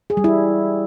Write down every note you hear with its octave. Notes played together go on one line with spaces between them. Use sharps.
G#4
G3
E4